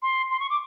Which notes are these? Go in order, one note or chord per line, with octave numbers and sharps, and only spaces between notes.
C6
C6
C#6
D6